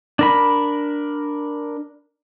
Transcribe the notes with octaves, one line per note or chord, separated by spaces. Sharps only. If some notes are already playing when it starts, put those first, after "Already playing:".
D4 A#4 B5